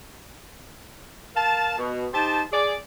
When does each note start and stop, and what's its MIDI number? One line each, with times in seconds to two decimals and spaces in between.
1.35 1.77 70
1.35 1.77 77
1.35 1.77 81
1.77 2.06 47
2.13 2.42 63
2.13 2.42 67
2.13 2.42 72
2.13 2.42 81
2.52 2.75 68
2.52 2.75 74